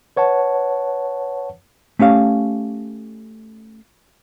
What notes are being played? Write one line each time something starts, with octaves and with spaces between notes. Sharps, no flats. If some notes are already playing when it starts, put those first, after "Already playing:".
B4 C#5 F#5 A5
A3 C#4 G4 F5